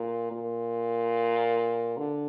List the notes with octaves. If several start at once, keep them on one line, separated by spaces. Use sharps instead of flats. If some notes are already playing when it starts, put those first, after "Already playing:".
Already playing: A#2
A#2
D3